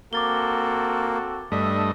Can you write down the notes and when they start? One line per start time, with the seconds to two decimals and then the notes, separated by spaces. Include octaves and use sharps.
0.13 A#3 C4 F#4 A4 D6 A6 G7
1.52 G2 A3 D4 D#5 E5